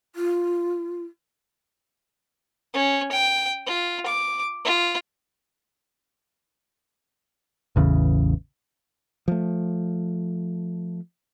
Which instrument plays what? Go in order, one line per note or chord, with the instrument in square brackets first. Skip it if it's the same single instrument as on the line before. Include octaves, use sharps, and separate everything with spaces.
[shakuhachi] F4
[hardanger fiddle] C#4
G5
F4
D6
F4
[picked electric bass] A1 E2 C#3
[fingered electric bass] F3 A3